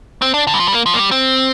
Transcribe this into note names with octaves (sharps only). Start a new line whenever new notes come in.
C4
D4
D3
G3
F3
G3
A#3
F3
A#3
G3
C4